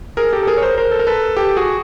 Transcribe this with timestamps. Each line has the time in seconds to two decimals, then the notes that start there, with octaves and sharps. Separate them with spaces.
0.17 G#4 A#4
0.33 G4 A4
0.43 A4
0.47 G#4 A#4
0.57 C#5
0.62 A#4 C5
0.77 A#4 C5
0.91 A4
1.00 A#4
1.07 A4 B4
1.36 G4 A4
1.56 F#4 G#4